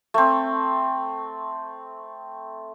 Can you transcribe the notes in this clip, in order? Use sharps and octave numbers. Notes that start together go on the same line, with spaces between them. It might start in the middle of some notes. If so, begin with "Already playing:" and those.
A3 C4